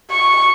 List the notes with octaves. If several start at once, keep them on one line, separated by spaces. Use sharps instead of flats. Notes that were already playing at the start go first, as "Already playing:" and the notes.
C#6